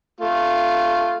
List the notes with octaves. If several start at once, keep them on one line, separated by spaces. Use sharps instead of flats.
A3 F4